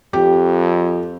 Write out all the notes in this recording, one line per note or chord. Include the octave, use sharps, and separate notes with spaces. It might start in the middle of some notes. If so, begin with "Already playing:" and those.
F2 G4